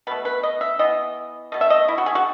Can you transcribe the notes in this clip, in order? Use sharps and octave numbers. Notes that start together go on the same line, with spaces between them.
B2 A3 B4
B4
D#5
E5
E3 B3 D#5
B2 A3 D#5
E5
D#5
E4
F#4
G#4
F#4